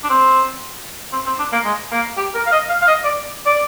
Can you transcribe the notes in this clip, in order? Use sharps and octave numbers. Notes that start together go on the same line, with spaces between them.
D4
C4
C4
C4
D4
A#3
G#3
A#3
G4
A#4
F5
D#5
F5
F5
D#5
D5
D5